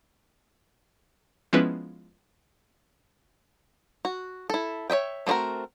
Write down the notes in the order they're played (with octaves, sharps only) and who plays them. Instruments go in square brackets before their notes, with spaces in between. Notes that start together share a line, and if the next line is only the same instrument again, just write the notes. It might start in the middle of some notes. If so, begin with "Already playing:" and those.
[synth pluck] F3 G#3 B3 C#4 E4 B4
[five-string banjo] F#4
E4 A4
C#5 D#5 E5 G5
A3 C4 D4 F#4 A#4